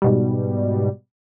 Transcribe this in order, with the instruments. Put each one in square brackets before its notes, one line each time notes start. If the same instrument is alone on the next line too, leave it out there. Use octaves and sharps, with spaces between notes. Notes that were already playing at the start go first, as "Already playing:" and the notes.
[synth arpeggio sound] G#2 B2 G3